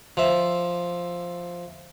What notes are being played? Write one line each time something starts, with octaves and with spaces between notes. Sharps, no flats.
F3 E5